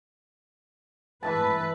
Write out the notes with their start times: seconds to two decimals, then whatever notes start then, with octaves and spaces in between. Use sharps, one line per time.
1.23 E3 B4 E5 A5